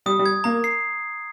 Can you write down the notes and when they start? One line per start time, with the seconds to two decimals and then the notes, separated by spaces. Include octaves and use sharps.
0.06 G3 D#6
0.19 G3
0.26 G#6
0.44 A#3 A#5
0.64 C7